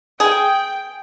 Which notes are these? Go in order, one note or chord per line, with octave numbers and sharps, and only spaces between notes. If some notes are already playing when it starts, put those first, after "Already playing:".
G#4 G5